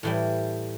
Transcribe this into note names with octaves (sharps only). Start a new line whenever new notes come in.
A2 E3 G3